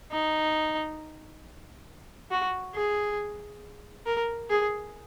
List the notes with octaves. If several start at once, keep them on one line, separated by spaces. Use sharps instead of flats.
D#4
F#4
G#4
A#4
G#4